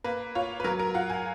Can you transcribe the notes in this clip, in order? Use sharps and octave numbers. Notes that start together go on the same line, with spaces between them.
A#3 B4
F4 C#5
B4
F#3 A#4
A#4
F4 F#5
G#5